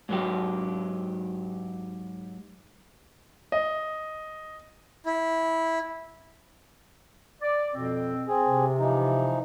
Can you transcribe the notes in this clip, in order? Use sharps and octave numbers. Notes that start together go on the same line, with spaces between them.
G#2 F#3 G4
D#5
E4
D5
F2 B2 C4
C4 G#4
C3
E3 F3 D#4